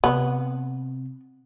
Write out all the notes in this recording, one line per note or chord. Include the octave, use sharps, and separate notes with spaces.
C3 B3